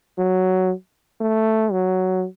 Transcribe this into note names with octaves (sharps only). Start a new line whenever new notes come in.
F#3
A3
F#3